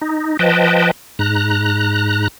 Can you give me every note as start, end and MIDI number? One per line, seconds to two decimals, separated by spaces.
0.01 0.37 63
0.39 0.91 53
0.39 0.91 71
0.39 0.91 75
0.39 0.91 79
0.39 0.91 81
1.19 2.28 44
1.19 2.28 82
1.19 2.28 90